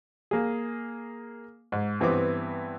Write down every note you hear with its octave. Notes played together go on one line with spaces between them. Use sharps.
A#3 G#4
G#2
G2 E3 B3 C4 D6